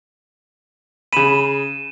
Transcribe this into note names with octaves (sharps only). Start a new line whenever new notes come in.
C#3 B5 D#7 E7